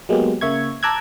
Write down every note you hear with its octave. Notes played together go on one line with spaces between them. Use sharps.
F#3 G#3 A#3 B3 G4
C#3 A#3 E5 C#6 G#6
A5 A#5 D6 E6 F#6 G#6